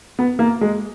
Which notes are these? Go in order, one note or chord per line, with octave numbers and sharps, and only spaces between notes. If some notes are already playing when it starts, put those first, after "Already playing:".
B3
A#3
G#3